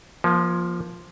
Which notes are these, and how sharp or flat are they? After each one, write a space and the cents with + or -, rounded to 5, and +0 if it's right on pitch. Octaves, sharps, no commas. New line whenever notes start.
F3 +0 A#3 +35